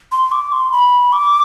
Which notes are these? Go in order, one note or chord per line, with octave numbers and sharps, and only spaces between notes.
C6
D6
C6
B5
D6